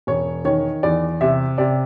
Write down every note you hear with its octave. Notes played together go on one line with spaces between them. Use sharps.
E1 C#5
D#3 C#5
E2 D5
C3 E5
C3 D5